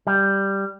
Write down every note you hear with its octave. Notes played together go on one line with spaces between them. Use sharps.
G3